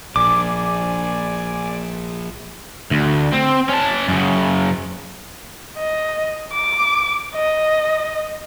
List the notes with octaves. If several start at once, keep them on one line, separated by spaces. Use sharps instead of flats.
A#1 D5 G#5 D6
D2
C4
C#4 A5
F#2 C#3
D#5
D6
D#5